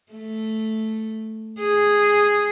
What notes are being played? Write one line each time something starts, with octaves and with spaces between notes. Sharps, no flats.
A3
G#4